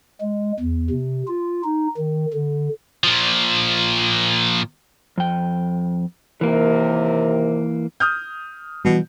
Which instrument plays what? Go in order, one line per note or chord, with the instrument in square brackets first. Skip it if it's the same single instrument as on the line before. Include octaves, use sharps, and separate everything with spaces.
[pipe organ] G#3
E2
C3
F4
D#4
D#3
D3
[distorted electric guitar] A#2 F3
[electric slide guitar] F2 G5
[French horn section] D#2 C3 A#4 [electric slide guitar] E3 A#3
[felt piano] D#6 F6 G6
[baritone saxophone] B2 [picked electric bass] E3 F3 G3